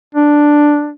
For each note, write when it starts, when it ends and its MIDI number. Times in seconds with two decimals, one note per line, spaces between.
0.15 0.92 62